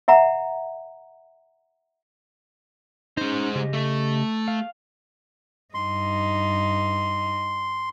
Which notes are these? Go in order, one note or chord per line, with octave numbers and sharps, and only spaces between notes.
E5 F#5 A#5
G#3 C#4 D#4 C5
C#3 G4 D#5
A3
F5
G2 D#4 C6